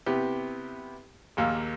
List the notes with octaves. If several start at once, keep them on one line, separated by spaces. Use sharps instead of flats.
C3 B3 E4 G4
A#1 D#2 A#3 F5 E6